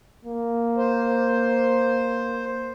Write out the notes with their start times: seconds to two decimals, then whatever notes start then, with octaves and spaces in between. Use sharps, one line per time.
0.25 A#3
0.77 C5